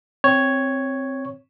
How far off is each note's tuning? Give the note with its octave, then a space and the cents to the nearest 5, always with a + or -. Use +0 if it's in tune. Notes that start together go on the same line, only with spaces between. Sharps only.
C4 +0 C#5 +0